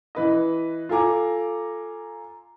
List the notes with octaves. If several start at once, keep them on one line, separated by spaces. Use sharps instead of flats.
E3 B4 D#5
F4 A4 G#5 A#5 D6